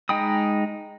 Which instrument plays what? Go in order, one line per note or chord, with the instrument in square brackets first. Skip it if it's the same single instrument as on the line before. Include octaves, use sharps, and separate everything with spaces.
[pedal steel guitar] G#3 D#4 G5 B5 D#6